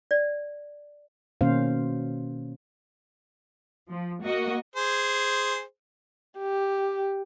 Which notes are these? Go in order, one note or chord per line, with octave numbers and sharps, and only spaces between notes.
D5
B2 D#3 A#3 C#4 C5 F5
F3
A#3 F#4 D#5
G#4 C5
G4